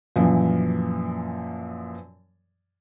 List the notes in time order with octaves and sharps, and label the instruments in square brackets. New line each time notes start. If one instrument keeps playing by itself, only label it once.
[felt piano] F#2 A#2 E3 F3